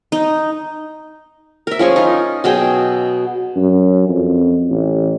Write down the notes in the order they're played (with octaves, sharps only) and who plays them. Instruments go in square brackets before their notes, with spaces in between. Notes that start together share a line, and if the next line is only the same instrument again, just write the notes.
[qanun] D#4
A#4 E5
F3 C#4 G#4 C#6
D#4 F4
B2 F#3 G#4 G5
[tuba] F#2
F2
A1